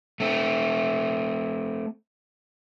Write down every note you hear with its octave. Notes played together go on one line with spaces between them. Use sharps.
A3 C4